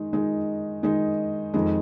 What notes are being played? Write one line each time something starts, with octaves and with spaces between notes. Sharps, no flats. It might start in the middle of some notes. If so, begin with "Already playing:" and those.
Already playing: D#3 G#3 D#4
D#3 G#3 D#4
D#3 G#3 D#4
F2 D#3 G#3